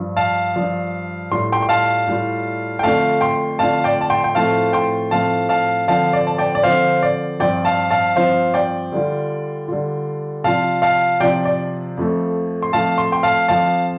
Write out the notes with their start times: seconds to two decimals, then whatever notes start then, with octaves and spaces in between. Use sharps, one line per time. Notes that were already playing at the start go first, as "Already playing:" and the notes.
Already playing: G2 F3 D4
0.17 F5 A5
0.55 G2 F3 D4
1.31 A2 G3 D4 F4 C6
1.52 G5 C6
1.62 C6
1.69 F5 A5
2.07 A2 G3 D4 F4
2.79 G5
2.83 F2 D3 A3 D4 F4 F5 A5
3.21 G5 C6
3.59 F2 D3 A3 D4 F4 F5 A5
3.84 D5 G5
4.01 A5
4.10 G5 C6
4.24 G5
4.35 A2 F3 A3 C4 F4 F5 A5
4.73 G5 C6
5.11 A2 F3 A3 C4 F4 F5 A5
5.49 F5 A5
5.88 D3 F3 C4 F5 A5
6.13 D5
6.27 A5
6.38 D5 G5
6.55 D5
6.63 D3 F3 C4 C5 F5
7.03 D5
7.40 G2 F3 C4 F4 D5 G5
7.65 F5 A5
7.91 F5 A5
8.16 G2 F3 C4 F4 C5 F5
8.54 D5 G5
8.92 D3 G3 D4 F4
9.68 D3 G3 D4 F4
10.44 C3 F3 D4 F4 F5 A5
10.82 F5 A5
11.20 C3 F3 D4 F4 D5 G5
11.45 D5
11.97 F2 F3 A3
12.62 C6
12.72 F2 F3 A3 F5 A5
12.98 C6
13.12 G5 C6
13.23 F5 A5
13.48 F2 F3 C4 F4 F5 A5